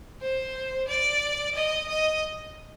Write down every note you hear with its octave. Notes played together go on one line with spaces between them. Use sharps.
C5
D5
D#5
D#5